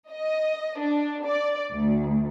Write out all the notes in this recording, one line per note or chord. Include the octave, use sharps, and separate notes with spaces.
D#5
D4
D5
D2